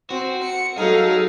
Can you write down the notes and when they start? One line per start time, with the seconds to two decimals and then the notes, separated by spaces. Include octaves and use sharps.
0.10 C4 F#4
0.43 C#7
0.78 F#3 D#4 G#4 A4 F5